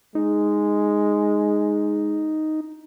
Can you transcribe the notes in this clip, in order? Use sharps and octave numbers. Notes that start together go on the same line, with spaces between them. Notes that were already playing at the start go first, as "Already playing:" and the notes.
G#3 D#4